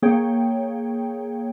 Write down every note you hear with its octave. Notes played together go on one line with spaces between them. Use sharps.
A#3 G#4 C#5 G5